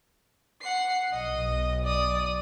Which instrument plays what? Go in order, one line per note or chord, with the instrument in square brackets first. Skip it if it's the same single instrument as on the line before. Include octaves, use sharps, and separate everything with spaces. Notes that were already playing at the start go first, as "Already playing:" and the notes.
[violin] F#5 C7
[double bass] B1 [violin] D#5
[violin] D5 D#6